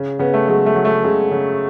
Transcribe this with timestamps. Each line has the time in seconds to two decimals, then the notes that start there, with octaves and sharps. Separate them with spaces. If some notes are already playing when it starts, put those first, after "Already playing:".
Already playing: C#3
0.19 C#3 B3
0.34 A3
0.48 F#3 G#3
0.66 A3
0.75 F#3
0.85 A3
1.03 C#3 G#3
1.31 C#3